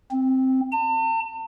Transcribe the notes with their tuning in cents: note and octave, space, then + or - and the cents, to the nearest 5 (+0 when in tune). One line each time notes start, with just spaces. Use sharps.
C4 +0
A5 +40